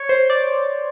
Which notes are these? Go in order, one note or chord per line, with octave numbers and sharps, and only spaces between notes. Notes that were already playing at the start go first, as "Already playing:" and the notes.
Already playing: C#5
C5
D5